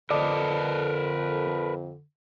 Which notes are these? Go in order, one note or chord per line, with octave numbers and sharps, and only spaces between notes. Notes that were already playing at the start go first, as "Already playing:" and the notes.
F2 D3 A#4 B4 D5 D#5 A5